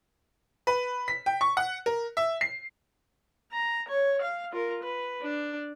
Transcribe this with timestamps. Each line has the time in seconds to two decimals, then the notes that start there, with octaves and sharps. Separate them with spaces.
0.67 B4
1.08 B6
1.26 G5
1.41 C#6
1.57 F#5
1.86 A#4
2.17 E5
2.41 C7
3.52 A#5
3.89 C#5
4.22 F5
4.52 F4 A#4
4.83 B4
5.22 D4